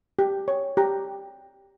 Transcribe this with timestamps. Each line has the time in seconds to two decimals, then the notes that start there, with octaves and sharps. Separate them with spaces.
0.19 G4
0.48 C#5
0.77 G4 A#5